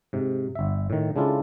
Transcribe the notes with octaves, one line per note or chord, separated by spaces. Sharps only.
G#2 C3
G1 E5
A2 D#3
C#3 G#3 D4 E4 F4 A4